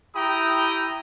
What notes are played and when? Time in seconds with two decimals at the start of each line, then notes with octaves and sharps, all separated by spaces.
0.15 E4 G4 G5 A#5 D#6